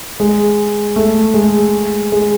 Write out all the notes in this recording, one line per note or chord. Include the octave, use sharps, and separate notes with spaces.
G#3
A3
G#3
G#3